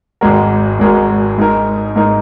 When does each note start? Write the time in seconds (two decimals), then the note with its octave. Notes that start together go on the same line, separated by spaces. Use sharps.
0.21 G#1 G#2 G#3 F#4 A#4
0.79 G#1 G#2 G#3 F#4 A#4
1.38 G#2 G#3 D#4 A#4
1.96 G#2 G#3 D#4 A#4